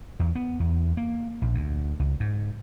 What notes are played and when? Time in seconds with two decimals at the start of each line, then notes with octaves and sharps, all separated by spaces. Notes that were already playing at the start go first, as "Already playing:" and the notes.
0.19 E2
0.35 B3
0.60 E2
0.97 A#3
1.42 A#1
1.55 D2
1.99 C#2
2.20 G#2